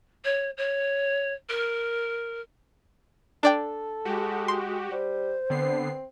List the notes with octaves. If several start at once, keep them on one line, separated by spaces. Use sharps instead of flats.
C#5
C#5
A#4
D4 A4 D5 G5
G#3 F#4 G4
C6
G3 C5
D3 B3 C4 C7